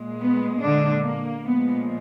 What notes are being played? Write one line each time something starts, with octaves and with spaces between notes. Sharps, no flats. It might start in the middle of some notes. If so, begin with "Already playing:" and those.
Already playing: A#2 G#3
B3
D3 D4
A#3
A#2 F3 G#3 B3